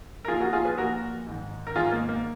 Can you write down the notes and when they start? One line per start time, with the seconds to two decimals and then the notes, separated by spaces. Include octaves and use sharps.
0.25 A#4
0.28 A#2 F3 F4 G#4
0.40 F#4 A#4
0.53 F4 G#4
0.65 G#4 B4
0.77 A#2 F3 F#4 A#4
1.27 G#2 D#3
1.67 A#4
1.76 G#2 D#3 F4 G#4
1.92 A#3
2.09 A#3